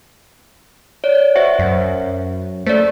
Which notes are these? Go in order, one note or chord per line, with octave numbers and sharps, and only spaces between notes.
C#5 D5
F#4 C5 E5
F#2
A3 C5 D5